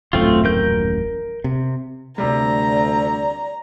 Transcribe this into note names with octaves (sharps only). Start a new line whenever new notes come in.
D#1 A1 F#2 A3 C4 F4
A#4 G6
C3
D2 C3 G3 D5 A#5